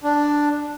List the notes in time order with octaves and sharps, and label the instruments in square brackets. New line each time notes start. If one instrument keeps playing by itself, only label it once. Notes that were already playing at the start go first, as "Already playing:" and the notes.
[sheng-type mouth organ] D4